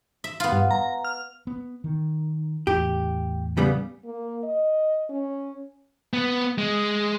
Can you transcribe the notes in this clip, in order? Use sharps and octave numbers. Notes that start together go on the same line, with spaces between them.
E5
B3 F4
G2
A#5
F6
B3
D#3
E2 A2 G4
C#3 G3 B3
A#3
D#5
C#4
B3
G#3